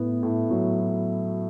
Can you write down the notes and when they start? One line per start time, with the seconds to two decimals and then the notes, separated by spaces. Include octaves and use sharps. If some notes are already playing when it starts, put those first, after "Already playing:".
Already playing: A2 B3
0.23 A2
0.51 F#3